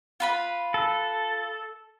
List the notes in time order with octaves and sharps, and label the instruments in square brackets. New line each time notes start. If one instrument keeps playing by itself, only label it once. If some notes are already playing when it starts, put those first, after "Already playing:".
[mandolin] F4 B4 B5
[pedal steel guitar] A4